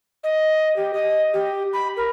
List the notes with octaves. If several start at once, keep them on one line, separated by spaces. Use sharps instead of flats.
D#5
G4
D#5
G4
B5
A#4